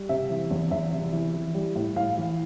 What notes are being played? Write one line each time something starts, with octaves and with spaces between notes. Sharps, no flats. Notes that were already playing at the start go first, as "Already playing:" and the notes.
Already playing: G3
C3 E5
E3
E2
E2 E5
C3
E3
E3
G3
A2
A2 F5
E3